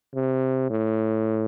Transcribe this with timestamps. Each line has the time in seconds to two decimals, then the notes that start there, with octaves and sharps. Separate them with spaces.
0.15 C3
0.70 A2